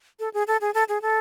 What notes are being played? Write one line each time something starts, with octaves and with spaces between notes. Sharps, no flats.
A4
G#4
A4
G#4
A4
G#4
A4